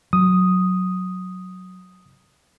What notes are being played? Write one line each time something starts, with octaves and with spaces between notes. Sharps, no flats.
F#3 D#6